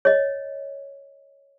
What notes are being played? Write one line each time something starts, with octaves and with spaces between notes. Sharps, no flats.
C#5 D#5